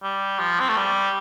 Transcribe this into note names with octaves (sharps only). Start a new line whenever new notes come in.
G3
F3
C4
A3
G3